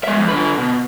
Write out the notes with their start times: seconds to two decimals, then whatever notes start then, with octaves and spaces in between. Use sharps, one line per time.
0.04 G#3 E5
0.16 F2 G#2
0.28 D3 B4
0.57 B2